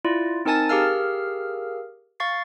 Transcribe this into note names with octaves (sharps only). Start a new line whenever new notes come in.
E4 F4 D5
C4 D#4 A#4 G#5 A5 A6
G4 G#4 A#4 F5 E6 F6
F5 C#6 A6 C7